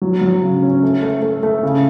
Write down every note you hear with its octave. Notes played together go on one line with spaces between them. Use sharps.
F#3
F#3
C#3
C#4
A3
A3
A3
A3
C#3